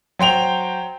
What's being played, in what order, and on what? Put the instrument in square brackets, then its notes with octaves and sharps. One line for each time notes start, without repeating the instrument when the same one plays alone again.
[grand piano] F#3 C5 G5 F7